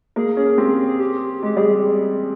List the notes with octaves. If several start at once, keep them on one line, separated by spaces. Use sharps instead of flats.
A#3 G#4
C#4 G#4
C4 G4
G#4
G#4
G4
G#3 G4
G3 G#4